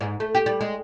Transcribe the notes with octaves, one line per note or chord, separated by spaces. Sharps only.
G#2
A3
G4
G3
G#3